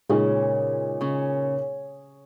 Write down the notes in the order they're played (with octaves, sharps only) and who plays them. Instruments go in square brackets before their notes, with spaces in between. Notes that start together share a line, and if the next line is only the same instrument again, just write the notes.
[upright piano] A#2 G#3 D#4 G#4 [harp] C#3 C#4
[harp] C#3 C#4